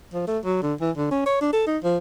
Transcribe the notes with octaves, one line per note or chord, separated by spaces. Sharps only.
F3
A3
F#3
D3
E3
D3
C#4
C#5
D4
A4
D#4
F3